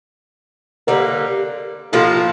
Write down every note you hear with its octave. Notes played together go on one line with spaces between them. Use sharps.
D3 G3 A#3 A#4 D5
A2 F3 A#3 F4 A4